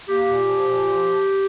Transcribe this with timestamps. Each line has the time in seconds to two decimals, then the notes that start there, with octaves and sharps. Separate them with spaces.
0.08 A#3 G4
0.28 A#2
0.46 F3
0.65 A#2
0.84 F3